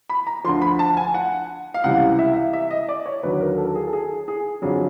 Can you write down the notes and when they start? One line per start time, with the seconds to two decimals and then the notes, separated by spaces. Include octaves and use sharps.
0.09 B5
0.27 A#5
0.44 D2 D3 F3 C6
0.62 B5
0.79 A5
0.97 G#5
1.14 F#5
1.74 F5
1.84 C#2 C3 E3 G3 F#5
2.19 E5
2.53 E5
2.71 D#5
2.89 D5
3.06 C#5
3.23 D#2 D3 F#3 B4
3.41 A#4
3.58 A4
3.75 G#4
3.88 A4
3.93 G#4
4.28 G#4
4.62 F2 D3 F#3 G#4